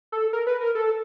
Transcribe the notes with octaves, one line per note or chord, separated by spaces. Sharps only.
A4
A#4
B4
A#4
A4